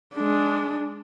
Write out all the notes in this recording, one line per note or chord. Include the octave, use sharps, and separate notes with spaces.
G#3 D4